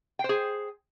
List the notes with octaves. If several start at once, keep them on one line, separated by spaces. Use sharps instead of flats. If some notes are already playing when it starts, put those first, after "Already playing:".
G#4 C5 G5